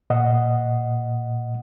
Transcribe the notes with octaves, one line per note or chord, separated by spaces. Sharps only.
A#2 D#5 F#5